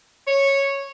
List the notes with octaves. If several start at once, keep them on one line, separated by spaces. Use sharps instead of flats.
C#5